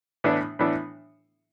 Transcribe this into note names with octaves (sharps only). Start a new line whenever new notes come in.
A2 E3 B3 D4
A2 E3 B3 D4